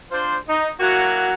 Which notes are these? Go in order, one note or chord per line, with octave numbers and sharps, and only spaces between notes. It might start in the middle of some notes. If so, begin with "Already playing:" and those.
D4 F4 C5
D#4
F#3 A#3 E4 F#4